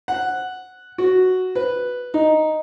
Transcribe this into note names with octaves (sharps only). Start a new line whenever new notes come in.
F#5
F#4
B4
D#4